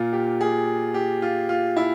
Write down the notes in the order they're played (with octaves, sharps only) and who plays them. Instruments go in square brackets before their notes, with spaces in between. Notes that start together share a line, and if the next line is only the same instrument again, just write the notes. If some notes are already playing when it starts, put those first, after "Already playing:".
Already playing: [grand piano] A#2 F4
G4
G#4
G4
F4
F4
E4